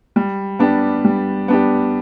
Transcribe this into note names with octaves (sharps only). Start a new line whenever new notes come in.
G3
B3 D4 G4
G3
B3 D4 G4